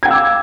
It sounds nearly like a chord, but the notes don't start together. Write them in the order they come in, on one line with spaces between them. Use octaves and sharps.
G#6 G5 F5 E6 D6